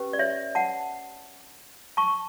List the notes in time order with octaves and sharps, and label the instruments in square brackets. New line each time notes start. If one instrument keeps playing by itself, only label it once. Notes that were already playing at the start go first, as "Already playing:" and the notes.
Already playing: [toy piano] C#4 G4 B4
D5
C#5 E5
F#5 A5
A5 C#6